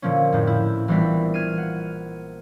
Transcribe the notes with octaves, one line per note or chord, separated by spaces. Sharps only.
A#2 D3 F3 A#3 C#4
F2 A2
E4
A#1 E3 G3 B3 D4 B6
F6 G#6 C7 D#7
F#5